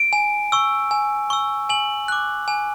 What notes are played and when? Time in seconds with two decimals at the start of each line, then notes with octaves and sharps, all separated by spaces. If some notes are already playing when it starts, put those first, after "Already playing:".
Already playing: D7
0.13 G#5
0.52 C#6 E6
0.91 G#5
1.30 C#6 E6
1.69 G#5 F#7
2.08 D6 F#6
2.48 G#5